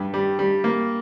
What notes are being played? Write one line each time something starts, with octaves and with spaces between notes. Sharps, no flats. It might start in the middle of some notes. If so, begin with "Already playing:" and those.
Already playing: G2
G3
G3
A#3